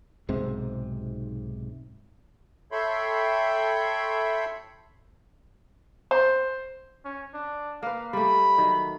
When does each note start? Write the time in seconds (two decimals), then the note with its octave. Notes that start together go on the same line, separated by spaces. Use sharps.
0.29 B1 G#2 C3 C4
2.72 A4 C#5 E5 G5 B5 C6
6.11 C5
7.05 C#4
7.34 D4
7.83 A#3 B4 F5
8.13 G3 A3 B5
8.58 D#3 F#3